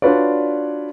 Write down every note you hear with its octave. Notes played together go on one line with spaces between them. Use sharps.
D4 F4 F#4 B4 C#5 D5